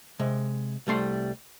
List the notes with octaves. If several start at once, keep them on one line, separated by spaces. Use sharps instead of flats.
C3 G#3
C2 G3 A3 C6